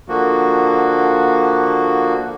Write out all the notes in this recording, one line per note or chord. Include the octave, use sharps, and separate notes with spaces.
D3 F3 A#3 F#4